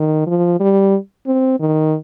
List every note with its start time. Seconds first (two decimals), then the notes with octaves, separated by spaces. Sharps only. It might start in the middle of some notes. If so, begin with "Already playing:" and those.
Already playing: D#3
0.27 F3
0.60 G3
1.27 C4
1.60 D#3